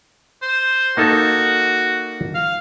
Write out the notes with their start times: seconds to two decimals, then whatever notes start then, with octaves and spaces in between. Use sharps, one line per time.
0.42 C5
0.97 A#3 D#4 F#4 A4
2.34 F5